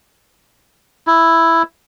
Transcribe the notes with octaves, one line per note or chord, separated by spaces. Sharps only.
E4